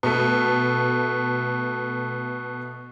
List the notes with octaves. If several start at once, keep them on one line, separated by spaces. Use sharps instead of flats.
B2 A3